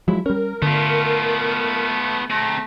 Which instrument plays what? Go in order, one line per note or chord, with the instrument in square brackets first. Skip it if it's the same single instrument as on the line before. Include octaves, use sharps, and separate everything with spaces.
[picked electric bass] F3 F#3 G#3 [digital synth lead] E4
[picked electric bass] G3 C#4 [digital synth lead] A#4
[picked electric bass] D3 [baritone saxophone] A3 [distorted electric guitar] B3 F4
[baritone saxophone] A3 [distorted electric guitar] C4 A#5 [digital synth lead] A#6